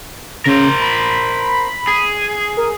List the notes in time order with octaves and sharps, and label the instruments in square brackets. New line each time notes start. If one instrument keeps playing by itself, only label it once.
[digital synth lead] C#3 [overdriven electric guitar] A#4 C5
[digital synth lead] B5
[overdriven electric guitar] G#4
[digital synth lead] A#4